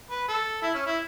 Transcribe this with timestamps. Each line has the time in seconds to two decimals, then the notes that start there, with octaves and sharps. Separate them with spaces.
0.11 B4
0.28 A4
0.62 E4
0.75 C#4
0.86 E4